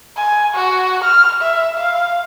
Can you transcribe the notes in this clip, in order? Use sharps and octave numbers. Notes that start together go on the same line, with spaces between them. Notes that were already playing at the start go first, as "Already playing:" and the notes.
G#5
F#4
F6
E5
F5